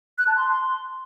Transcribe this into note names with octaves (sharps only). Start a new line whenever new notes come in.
F#6
A5
C6